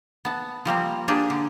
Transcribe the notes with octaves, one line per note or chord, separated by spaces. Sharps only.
B3 A5
F3 G3 A#3 C4
A#3 D4 G4 G#4
D3